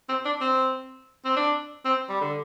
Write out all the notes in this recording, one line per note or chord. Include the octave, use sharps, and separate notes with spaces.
C4
D4
C4
C4
D4
C4
G3
D3